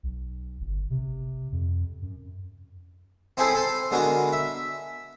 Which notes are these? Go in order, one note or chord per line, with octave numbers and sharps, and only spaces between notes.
B1
G1
C3
F2
F#2
C4 D#4 E4 G#4 A4 C5
A4 C6
D3 G#3 B3 F#4 A#4
E5